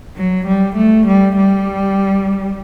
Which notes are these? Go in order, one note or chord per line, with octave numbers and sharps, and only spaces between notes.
F#3
G3
A3
G3
G3